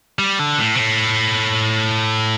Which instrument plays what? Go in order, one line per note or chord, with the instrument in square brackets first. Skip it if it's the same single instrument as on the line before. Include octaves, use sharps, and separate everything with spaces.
[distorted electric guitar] G3
D3
A2
C3
A2